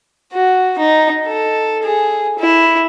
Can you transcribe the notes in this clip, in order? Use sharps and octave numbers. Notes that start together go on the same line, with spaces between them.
F#4
D#4
A4
G#4
E4